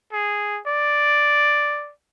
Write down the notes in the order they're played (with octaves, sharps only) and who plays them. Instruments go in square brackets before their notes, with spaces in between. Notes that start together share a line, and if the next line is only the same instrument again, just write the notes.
[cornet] G#4
D5